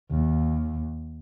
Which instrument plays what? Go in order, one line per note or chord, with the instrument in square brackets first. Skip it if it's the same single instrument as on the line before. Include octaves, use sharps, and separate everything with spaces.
[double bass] D#2